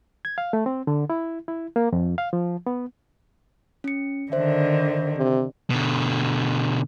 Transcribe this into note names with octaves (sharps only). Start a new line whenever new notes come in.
G#6
F5
A3
C4
D3
E4
E4
A#3
F2
F5
F3
B3
C#4 C#7
D3 D#3 C5 E5
C3
B2 D3